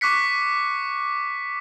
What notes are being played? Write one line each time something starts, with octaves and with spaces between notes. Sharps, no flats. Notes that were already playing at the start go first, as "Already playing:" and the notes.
C#6 D6 F#6 B6 C#7